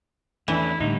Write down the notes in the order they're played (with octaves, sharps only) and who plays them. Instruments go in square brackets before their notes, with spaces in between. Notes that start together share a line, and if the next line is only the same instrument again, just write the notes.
[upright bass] E2 [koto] E3 [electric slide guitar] A3 C#4 D4 [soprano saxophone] E4
[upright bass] A2 [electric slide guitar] D3 G3 [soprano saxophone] D#4